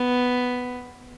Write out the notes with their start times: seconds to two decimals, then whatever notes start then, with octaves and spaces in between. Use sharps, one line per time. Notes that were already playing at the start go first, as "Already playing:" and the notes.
Already playing: B3